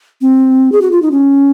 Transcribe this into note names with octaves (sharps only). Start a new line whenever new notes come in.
C4
G#4
F#4
F4
D#4
C#4